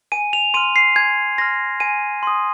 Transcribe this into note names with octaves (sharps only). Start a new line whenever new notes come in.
G#5 D#7
F7
C6 F6 D#7
C7
G#5 G#6
C6 F6 A#6
G#5 D#7
C6 D#6